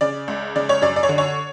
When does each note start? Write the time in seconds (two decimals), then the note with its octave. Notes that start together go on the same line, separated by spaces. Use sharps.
0.01 C#3 D5
0.28 C#2
0.56 C#3 D5
0.69 C#5
0.82 F#2 D5
0.96 D5
1.03 C#5
1.09 D3
1.18 C#5